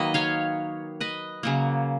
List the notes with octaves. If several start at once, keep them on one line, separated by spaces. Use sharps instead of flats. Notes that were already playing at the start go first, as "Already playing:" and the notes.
Already playing: D#3 F#3 A#3 B4 D#5
C#5 F5
B4 D#5
C#3 F#3 A#3